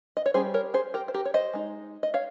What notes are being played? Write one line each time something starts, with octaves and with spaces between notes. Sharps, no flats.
D#5
C#5
G3 C#4 G#4 C5
A#4 C#5
G#4 C5
G4 A#4
C5
G4 A#4
C#5
C5 D#5
G#3 D#4
D#5
C#5 F5